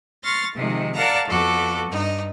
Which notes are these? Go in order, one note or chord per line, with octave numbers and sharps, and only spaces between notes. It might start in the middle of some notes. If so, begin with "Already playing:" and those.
C6 C#6 F6 A6 A#6
C3 D#3 F3 G#3
A#4 D5 F5 F#5 A5 A#5
F2 B3 F#4 A4 D6
G2 D#4